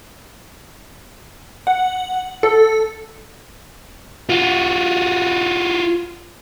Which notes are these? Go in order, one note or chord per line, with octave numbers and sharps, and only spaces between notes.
F#5
A4
F4 F#4